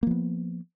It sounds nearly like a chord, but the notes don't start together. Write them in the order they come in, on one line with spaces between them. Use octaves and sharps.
A#3 F3 B3